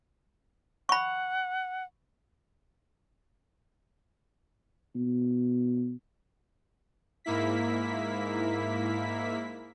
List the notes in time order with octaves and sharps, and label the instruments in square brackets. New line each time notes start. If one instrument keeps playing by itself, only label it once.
[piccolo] F#5 [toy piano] B5 C#6
[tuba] B2
[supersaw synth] G#2 A#3 E4 B6